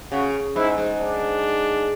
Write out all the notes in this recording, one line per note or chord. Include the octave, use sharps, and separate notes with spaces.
C#3 F#4
G#2 E4
G#2
D4